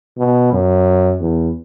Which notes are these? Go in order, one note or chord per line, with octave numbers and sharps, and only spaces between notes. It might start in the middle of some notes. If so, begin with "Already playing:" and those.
B2
F#2
E2